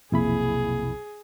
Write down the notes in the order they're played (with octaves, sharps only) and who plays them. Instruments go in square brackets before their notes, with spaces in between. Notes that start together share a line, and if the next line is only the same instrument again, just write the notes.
[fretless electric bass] B1 C3 [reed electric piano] F2 E4 B5 [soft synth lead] A#3 [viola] G#4